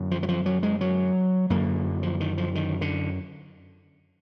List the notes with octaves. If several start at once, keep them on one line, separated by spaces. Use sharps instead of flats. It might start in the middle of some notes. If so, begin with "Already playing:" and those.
Already playing: F#2 D3
F3
F#3
F3
F#3
G#3
F#3
F#2 D3 A#3
F3
D#3
F3
D#3
D3